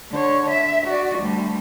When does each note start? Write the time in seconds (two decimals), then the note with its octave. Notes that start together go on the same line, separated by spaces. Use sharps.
0.11 D3 C#5
0.51 E5
0.87 F#4 D5
1.19 D2 G3